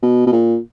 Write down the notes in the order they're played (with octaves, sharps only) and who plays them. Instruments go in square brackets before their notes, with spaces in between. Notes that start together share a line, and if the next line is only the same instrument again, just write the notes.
[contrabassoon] B2
B2
A#2